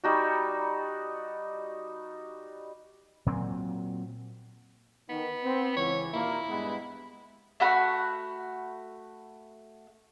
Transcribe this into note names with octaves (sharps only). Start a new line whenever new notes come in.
G3 D#4 F#4
A#2 F#3 C4
D#3 B3
C4
C#2 E3 C#5
D#2 A#2 A#3 E4
G2 G#3 B3
A3 F#4 F#5 B5